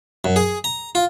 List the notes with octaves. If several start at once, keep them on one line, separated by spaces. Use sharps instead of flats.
F#2
G#4
A#5
F4